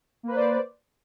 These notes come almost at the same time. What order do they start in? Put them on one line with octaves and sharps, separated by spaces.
A#3 B4 C5 D5